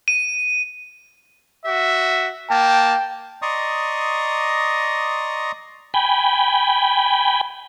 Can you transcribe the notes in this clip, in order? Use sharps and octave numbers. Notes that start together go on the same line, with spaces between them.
D#7
F#4 E5
A#3 G5 A5
D5 D#5 A#5 C6 C#6 D#6
G5 G#5 B5